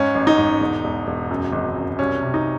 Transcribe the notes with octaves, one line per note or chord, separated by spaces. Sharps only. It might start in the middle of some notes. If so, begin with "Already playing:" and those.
Already playing: G#2 C#4
A1
D#4
G#2
E1
E1
E1
F#2
G#1
F#2
C2 C#4
C3
D#4